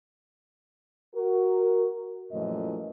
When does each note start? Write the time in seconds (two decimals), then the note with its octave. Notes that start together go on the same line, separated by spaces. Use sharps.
1.13 F#4 A#4
2.32 F#2 A#2 E3 F3 A3 D#5